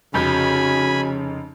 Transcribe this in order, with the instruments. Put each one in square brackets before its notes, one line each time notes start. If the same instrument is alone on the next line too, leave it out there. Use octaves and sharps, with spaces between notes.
[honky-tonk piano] F1 G6 [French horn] C#3 [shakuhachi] F#4 [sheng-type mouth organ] G#5 B5